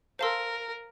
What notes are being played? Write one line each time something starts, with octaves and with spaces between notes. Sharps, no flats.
A#4 C5 F5 A5 C6 E6